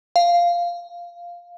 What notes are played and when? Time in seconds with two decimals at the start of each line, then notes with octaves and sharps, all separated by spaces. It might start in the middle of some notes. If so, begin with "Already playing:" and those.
0.16 F5